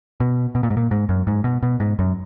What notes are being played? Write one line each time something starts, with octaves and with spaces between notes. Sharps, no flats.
B2
B2
A#2
G#2
A#2
G#2
F#2
G#2
B2
B2
G#2
F#2